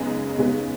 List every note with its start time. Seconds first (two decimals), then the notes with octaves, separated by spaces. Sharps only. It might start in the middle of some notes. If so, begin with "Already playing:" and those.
Already playing: F#2 C#3 G#3 B3 D#4
0.38 C#3 G#3 B3